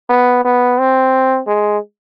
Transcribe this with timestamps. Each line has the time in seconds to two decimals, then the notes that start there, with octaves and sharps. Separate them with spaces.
0.10 B3
0.45 B3
0.79 C4
1.47 G#3